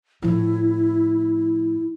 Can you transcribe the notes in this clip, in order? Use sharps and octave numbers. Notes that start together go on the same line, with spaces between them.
A2 F3 E4